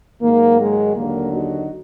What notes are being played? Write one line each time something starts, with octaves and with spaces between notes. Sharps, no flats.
G#2 D#3 F#3 A#3
G#3
D#2 D3 F#3 A#3
D#4 F#4